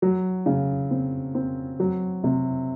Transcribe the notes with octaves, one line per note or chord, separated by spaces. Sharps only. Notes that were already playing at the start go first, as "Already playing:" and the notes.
F#3
C#3
C4
C4
F#3
C3